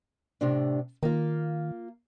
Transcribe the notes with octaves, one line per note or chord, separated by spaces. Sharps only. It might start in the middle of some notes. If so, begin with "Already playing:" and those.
A2 C3 D4
D#3 A#3 F4